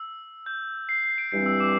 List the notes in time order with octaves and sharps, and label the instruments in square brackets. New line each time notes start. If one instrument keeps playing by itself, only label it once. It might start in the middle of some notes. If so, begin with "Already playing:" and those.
Already playing: [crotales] E6
G6
C7
C7
D7
[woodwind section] G2 E3 G3 C4 [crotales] C7
[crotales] E6
D6